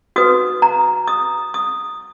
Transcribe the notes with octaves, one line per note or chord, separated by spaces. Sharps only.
F#4 B4 D#6
A#5
D#6
D#6